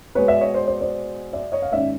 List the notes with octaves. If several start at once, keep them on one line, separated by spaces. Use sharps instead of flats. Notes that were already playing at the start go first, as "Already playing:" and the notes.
B2 G#3 B3 B4 C#5
D5 E5
C#5 D#5
C5 D5
C5 D5
C5 D5
D5 E5
C#5 D#5
F5
G#2 D#3 G#3 C#4 D5 E5